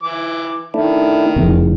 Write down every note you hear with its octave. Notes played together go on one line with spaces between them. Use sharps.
E3 D6
D#3 A3 D4 E4
F1 E2 C#3